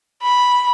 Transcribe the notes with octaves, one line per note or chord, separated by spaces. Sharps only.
B5